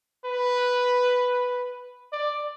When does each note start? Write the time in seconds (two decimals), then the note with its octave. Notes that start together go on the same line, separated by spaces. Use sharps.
0.25 B4
2.12 D5